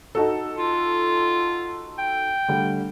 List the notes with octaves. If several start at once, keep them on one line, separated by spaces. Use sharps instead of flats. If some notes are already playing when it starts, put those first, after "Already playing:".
D#4 F#4 A4
F4
G5
D3 G3 A3